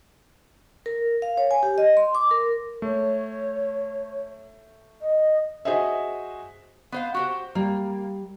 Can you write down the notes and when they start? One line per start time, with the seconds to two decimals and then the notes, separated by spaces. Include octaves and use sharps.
0.86 A#4
1.22 F5
1.38 C#5
1.51 G#5
1.63 G4
1.78 D#5
1.97 C6
2.15 D6
2.31 A#4
2.82 A3 C#5
5.01 D#5
5.65 F#4 G#4 C5 D#5 E5
6.92 B3 C5 F5
7.14 F#4 G4 C5
7.55 G3 A#3